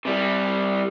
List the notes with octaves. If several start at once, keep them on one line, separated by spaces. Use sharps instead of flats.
C3 G3